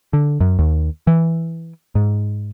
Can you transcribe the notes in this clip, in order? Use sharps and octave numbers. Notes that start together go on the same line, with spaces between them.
D3
F#2
D#2
E3
G#2